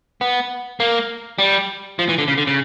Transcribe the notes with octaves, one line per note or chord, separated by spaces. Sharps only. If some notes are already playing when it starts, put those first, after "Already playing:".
B3
A#3
G3
F3
E3
D3
C#3
D3
C#3